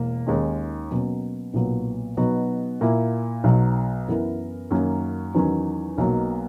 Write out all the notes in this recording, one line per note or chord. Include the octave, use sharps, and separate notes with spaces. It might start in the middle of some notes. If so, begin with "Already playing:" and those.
Already playing: E1 A#3
D#2 D#3 G#3 C#4
B2 F#3 A#3 C#4
B1 A#2 F#3 B3 F#4
B2 F#3 B3 D#4 F#4
A#2 A#3 E4
B1 B2 F#3
F#2 E3 B3 E4 A#4
F#2 D#3 F#3 A#3 C#4
E2 D#3 F#3 C#4
B1 B2 F#3 A#3